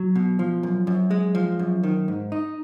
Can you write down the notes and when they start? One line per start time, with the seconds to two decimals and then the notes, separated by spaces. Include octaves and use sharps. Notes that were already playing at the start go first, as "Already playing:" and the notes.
Already playing: F#3
0.15 B2
0.39 F3
0.63 F#2
0.87 F#2
1.11 G#3
1.35 F3
1.59 F#2
1.83 D#3
2.08 G#2
2.32 D#4